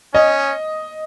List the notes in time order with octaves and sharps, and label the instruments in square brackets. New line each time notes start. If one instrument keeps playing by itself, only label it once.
[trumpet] C#4 [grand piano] D#5